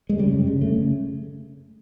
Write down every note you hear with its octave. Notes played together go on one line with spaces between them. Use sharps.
G#3
C#3 G3
F#2
G#3
C#3
C#3 A3
C#3